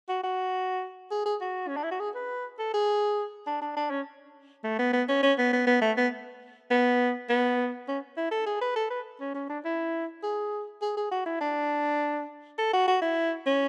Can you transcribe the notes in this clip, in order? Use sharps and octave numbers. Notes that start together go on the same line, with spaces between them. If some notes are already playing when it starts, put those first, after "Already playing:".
F#4
F#4
G#4
G#4
F#4
C#4
D4
E4
F#4
G#4
B4
A4
G#4
D4
D4
D4
C#4
A3
B3
B3
C#4
C#4
B3
B3
B3
A3
B3
B3
B3
C#4
E4
A4
G#4
B4
A4
B4
C#4
C#4
D4
E4
G#4
G#4
G#4
F#4
E4
D4
A4
F#4
F#4
E4
C#4